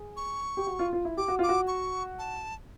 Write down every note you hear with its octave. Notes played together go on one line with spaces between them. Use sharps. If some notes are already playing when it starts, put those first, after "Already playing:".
Already playing: G#4
C#6
G4
F#4
F4
F4
E4
G4 D6
F#4
F4 D6
F#4
C#6
A5